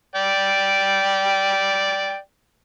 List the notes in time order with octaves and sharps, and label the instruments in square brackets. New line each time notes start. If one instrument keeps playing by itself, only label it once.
[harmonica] D5 G5